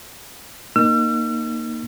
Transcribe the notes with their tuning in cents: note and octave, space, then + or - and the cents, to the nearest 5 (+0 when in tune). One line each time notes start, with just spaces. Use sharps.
A#3 +0 D#4 -15 E6 +45